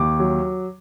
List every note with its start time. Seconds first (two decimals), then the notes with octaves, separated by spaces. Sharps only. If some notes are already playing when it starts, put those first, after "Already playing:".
Already playing: D#2 D6
0.20 F#3